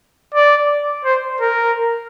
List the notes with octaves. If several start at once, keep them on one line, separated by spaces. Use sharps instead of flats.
D5
C5
A#4